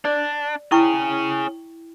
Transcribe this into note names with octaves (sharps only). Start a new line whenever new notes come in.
D4 D5
C#4 E4 G#4 G5 C#6